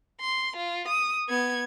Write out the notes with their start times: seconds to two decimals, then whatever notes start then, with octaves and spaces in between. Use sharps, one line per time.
0.21 C6
0.57 F4
0.88 D#6
1.28 B3 G#6